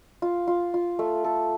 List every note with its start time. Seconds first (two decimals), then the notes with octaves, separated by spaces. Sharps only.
0.22 F4
0.48 F4
0.74 F4
0.99 A3
1.24 A4